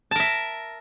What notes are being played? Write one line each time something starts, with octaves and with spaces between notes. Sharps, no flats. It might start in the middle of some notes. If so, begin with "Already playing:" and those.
A#4 E5 A5